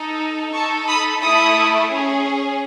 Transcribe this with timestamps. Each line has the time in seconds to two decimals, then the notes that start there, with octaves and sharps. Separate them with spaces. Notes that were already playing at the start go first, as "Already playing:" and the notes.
Already playing: D#4 A4
0.53 D#4 A4 A5 C#6
0.88 B5 D#6
1.22 A3 E4 A4 B5 D#6
1.91 C#4 G#4